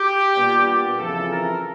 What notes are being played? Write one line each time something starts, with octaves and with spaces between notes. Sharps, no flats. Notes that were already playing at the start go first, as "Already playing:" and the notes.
Already playing: G4
A#2 G3 B3 D4
F2 C#3 E3 A4
A#4